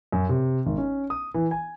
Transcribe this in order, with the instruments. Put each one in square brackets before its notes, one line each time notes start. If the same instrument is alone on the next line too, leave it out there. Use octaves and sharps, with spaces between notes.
[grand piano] F#2
C3
G#1
C#4
D#6
E3
G#5